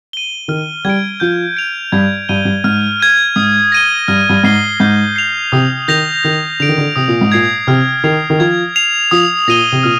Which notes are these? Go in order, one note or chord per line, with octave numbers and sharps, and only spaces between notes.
D#7 G7
D#3 F6
G3 G#6 D7
F3 G6
D7 F7
G2 G#6
G2 D#7 G7
G2
G#2 F6
G#6 D#7
G#2 D#6
A#6 D#7 G7
G2 F6
G2
G#2 C7 D#7 G7
G#2 G6
C7 F7
C3 D#6
D#3 G6 A#6 F7
D#3 G6
D3 D7 F7
D#3
D3
C3 D#6
A#2
G#2
A#2 G#6 C7
C3 F6
D#3 C7 F7
D#3
F3 G#6
C7 F7
F3 D#6
A#2 A#6 D#7 G7
C3
A#2 F6